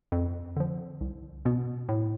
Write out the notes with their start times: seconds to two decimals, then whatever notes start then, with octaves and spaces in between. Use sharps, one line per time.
0.12 F2
0.56 D3 F3
1.01 C2
1.45 B2 B3
1.89 A2